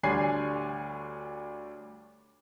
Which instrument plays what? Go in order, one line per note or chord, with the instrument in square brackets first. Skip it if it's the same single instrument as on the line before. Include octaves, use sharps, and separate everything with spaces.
[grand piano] D2 G3 D4 C#5 G#5 C7